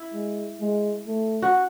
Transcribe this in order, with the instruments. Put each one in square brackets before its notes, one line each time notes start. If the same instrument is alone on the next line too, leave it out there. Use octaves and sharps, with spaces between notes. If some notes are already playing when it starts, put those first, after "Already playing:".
Already playing: [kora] E4
[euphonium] G#3
G#3
A3
[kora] F#4